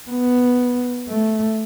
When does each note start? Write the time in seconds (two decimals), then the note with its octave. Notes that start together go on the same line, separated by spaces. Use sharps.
0.10 B3
1.09 A3